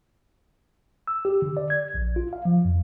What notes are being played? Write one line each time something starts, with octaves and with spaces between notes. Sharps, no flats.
E6
G4
D3
D5
G#6
A#1
F4
F5
F3
F2